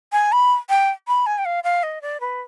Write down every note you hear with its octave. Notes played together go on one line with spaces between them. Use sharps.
G#5
B5
G5
B5
G#5
G5
F5
F5
D#5
D5
B4